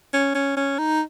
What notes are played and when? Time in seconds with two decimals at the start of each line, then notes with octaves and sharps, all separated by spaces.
0.13 C#4
0.35 C#4
0.56 C#4
0.78 D#4